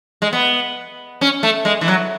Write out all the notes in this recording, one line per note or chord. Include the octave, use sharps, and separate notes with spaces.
G#3
B3
C#4
A3
G#3
E3
F#3